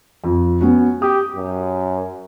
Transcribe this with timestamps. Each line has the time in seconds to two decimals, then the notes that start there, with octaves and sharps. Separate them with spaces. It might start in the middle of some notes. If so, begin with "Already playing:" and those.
0.24 F2
0.61 B3 C#4 F#4
1.02 G4 D#6
1.35 F#2